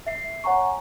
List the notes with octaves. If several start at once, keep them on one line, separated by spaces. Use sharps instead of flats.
E5 C7
C#5 F#5 G#5 A#5 C#6